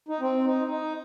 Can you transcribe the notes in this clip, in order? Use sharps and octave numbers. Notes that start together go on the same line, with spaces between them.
D#4
C4
D#4
D#4